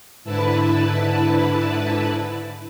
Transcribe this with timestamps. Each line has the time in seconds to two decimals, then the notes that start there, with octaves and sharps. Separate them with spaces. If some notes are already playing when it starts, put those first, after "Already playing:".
0.24 G#2 D3 E4 B4 A5